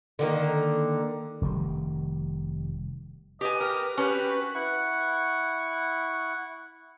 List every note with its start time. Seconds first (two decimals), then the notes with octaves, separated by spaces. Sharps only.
0.19 D3 D#3 A#3
1.42 F1 D#3 G3
3.41 G4 B4 D#5 G#5
3.60 G4 A#4
3.97 C#4 F#4 G4 B4
4.55 E4 F#5 C#6